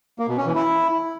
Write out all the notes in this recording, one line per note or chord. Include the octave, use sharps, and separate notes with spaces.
A#3
B2
C#4
E3
E4